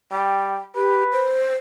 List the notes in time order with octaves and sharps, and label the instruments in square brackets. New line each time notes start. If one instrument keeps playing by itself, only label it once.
[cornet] G3 [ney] G5
[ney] G4 [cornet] B4
[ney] C5